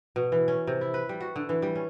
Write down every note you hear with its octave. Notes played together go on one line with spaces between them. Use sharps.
B2
E3
C#4
C3
E4
B4
G3
F#4
D3
E3
G3
C#4